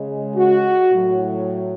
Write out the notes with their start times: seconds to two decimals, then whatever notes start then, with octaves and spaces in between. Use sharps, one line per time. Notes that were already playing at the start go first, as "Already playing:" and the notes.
Already playing: C#3 G#3
0.37 F#4
0.92 A2 F#3